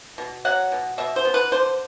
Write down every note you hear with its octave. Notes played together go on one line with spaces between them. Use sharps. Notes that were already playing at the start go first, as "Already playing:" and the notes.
B2
F#3 F#5
B2
B2 E5
C5
B3
B4
D3 C5